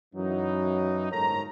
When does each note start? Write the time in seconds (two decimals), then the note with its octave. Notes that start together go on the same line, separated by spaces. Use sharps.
0.14 F#2 E3 F#3 D#4
1.11 G1 G#2 A4 A#4 C#5 A#5